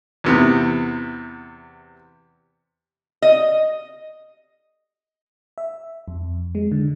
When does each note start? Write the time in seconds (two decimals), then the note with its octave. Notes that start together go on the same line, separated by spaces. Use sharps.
0.24 E2 C3 B3
3.22 D#5
5.58 E5
6.08 F2
6.55 G#3
6.72 D3